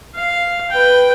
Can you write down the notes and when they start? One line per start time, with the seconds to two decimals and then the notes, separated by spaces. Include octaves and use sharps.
0.15 F5
0.70 B4 G5